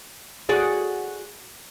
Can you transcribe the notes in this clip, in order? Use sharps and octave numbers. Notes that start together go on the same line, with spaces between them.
F#4 G#4 D5